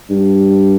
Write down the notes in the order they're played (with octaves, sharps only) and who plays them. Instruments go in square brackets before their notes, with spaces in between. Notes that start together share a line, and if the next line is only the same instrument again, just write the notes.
[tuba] G2